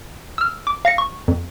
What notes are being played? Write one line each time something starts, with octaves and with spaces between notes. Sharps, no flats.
E6 F6
D6
F5 A#6 C#7
C#6
F2